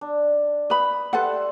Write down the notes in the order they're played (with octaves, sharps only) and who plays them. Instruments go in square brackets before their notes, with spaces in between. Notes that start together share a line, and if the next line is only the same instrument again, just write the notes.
[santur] D4
[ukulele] B4 B5 [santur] D#6
[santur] G3 C5 E5 [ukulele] A4 B4 F#5